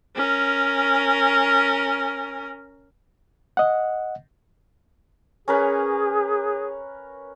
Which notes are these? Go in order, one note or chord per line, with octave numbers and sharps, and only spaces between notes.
C#4 A#4
D#5 F#5
C#4 G#4 A#4 B4